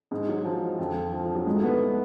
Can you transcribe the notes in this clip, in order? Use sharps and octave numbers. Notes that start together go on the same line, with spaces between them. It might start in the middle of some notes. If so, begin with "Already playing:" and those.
G#2 G#3
F#3
F3
F2 D3
F3
F3
F#3
G#2 G#3
A3
B3